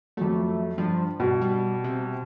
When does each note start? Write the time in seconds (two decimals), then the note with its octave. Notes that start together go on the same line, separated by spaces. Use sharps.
0.17 F2 F#3 A3
0.78 G2 F3
1.20 G2 B2
1.41 G3
1.84 C3